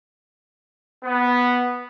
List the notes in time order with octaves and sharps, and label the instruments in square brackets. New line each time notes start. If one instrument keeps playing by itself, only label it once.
[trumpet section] B3